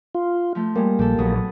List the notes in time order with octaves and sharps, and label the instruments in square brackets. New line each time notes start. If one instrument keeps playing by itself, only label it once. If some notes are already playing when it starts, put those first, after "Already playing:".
[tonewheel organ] F4
[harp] F3 A3
[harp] G3 G#3 [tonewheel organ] A#3
[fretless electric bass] A#1 [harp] G4 A4
[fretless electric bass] A#1 [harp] B2 F#3 D#6